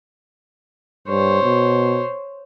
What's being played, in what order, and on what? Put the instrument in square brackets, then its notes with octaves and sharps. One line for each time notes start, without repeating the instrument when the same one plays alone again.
[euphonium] G2 [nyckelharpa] C5 C#5
[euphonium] B2